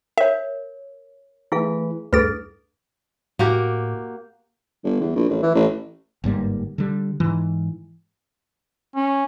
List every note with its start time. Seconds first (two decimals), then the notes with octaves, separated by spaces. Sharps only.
0.18 A#4 C#5 E5
1.52 E3 A3 E4 G#4 F5
2.13 D2 G2 G#4 A4 B4 A6
3.39 A2 A#3 F#4 G4
4.84 G1
5.00 E2
5.15 A#1
5.29 A1
5.42 E3
5.55 A1
6.24 G1 G#2 G3 A#3
6.78 D3 G3
7.20 G#2 E3
8.96 C#4